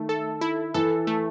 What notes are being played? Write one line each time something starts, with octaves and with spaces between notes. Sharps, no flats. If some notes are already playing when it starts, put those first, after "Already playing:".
Already playing: D#3 A3
A4
E4
E3 A4
A3